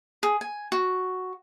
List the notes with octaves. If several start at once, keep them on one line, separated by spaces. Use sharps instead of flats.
G#4
G#5
F#4